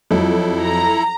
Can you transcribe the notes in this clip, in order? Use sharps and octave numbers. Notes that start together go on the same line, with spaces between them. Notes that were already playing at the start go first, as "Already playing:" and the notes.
F2 F#3 E4 A4
A#5